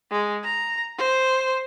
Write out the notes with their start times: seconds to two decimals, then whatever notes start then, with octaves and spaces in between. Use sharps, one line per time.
0.11 G#3
0.43 A#5
0.98 C5